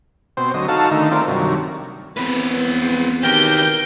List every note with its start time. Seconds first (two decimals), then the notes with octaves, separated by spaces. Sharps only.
0.37 B2 C4 C5
0.54 D2 F#3 D#5
0.68 D#4 F#4 A4 F5 A5
0.91 D3 D#3 A3 D#4
1.12 A3 C4 F4 A#4 D5
1.28 G2 C3 D#3 F#3
2.17 E2 C4 B4
3.23 B2 D#3 G4 A#4 G5 G6